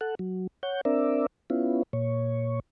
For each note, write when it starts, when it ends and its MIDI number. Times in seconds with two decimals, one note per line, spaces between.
0.01 0.15 69
0.01 0.15 78
0.19 0.47 54
0.63 0.81 73
0.63 0.81 78
0.63 0.81 91
0.85 1.26 60
0.85 1.26 62
0.85 1.26 70
0.85 1.26 74
0.85 1.26 76
1.50 1.83 59
1.50 1.83 61
1.50 1.83 64
1.50 1.83 65
1.93 2.60 46
1.93 2.60 73